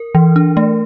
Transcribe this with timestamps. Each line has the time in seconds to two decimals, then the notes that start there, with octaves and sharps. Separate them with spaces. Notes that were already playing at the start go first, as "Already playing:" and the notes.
Already playing: A#4
0.15 E3
0.36 D4
0.57 A3